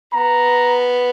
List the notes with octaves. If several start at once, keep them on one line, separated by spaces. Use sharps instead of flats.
B3 A#5